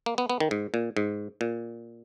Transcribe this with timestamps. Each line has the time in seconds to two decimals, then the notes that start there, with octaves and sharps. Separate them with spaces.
0.06 A#3
0.18 B3
0.30 B3
0.40 D#3
0.51 G#2
0.74 A#2
0.97 G#2
1.41 A#2